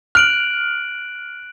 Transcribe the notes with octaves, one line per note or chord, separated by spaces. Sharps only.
F6 F#6 D7 F#7